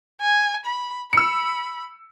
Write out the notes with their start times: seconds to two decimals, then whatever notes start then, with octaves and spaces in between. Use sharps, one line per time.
0.21 G#5
0.65 B5
1.13 B5 E6 C#7